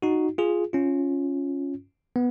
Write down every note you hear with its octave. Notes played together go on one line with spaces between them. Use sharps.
D#4 F#4
F4 G#4
C#4 F4
B3